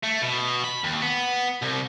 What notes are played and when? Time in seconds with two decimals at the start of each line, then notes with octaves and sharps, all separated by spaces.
0.04 A3
0.22 B2
0.64 B5
0.84 D#2
1.02 B3
1.62 C2